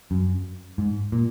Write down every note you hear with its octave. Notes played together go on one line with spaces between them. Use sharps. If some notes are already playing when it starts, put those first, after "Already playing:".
F#2
G#2
A#2